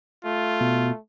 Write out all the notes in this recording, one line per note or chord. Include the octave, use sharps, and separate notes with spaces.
A3 F4
B2